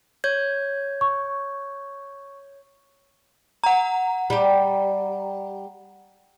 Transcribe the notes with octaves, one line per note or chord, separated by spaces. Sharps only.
C#5 G6 G#6
C#6
F#5 A#5
G3 G4